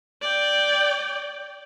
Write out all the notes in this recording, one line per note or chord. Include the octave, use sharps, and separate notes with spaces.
D5 G5